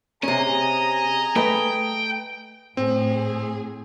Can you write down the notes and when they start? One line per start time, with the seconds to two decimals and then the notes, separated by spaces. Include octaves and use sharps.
0.23 C3 C#4 G#4 D#5 G#5 A#5
1.36 A3 B4 D#5 G5
2.77 A2 C4 G#4